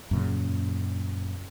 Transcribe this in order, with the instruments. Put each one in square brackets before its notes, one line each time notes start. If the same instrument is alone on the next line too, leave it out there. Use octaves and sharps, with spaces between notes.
[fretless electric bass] F#2 A#2 C#3